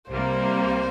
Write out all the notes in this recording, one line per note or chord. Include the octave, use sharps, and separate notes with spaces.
C2 C3 G3 A#3 C5